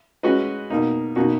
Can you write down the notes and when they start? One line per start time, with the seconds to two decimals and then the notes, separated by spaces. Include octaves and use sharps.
0.23 G#3 C#4 F#4 B4 D#5
0.70 B2 A#3 D#4
1.16 B2 A#3 D#4 F#4